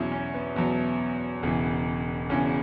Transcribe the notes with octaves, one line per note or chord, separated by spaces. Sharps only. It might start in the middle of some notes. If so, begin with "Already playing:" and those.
Already playing: E2 B2 F#3 C#4 E4 G#4
C#4
B3
E2 B2 F#3
E1 E2 C#3 E3
E1 E2 C#3 E3 C#4